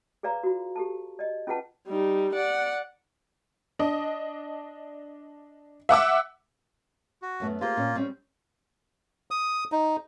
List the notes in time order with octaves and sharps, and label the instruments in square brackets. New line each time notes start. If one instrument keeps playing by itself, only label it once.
[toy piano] G#4 B4 D5 F5 A#5
F4 F#4
G4 A4 A5
D5 D#5
C#4 F4 G#4 B4 F#5 A5
[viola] G3 D#4
D5 F#5
[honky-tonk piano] D4 D#5
E5 F#5 D6 E6
[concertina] F#4
[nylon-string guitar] F#2 A3 B3
[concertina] A#3 F4 [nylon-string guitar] G4 G#4 C5
[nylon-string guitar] A#2 C#4
G3 C4 C#4
[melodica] D#6
D#4